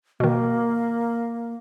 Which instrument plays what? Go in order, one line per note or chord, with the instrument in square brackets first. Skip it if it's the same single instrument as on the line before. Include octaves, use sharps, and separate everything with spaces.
[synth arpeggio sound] B2 D#3 [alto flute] A#3